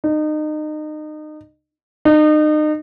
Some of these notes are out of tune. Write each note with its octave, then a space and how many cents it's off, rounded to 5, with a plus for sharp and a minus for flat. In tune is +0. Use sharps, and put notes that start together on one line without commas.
D#4 -30
D#4 -35